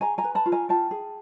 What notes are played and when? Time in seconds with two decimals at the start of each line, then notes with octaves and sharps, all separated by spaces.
0.01 G#4 G#5 A#5
0.18 G#5 A#5
0.24 B4
0.35 A5 B5
0.46 F4
0.52 G#5 A#5
0.69 F4 G5 A5
0.91 G#4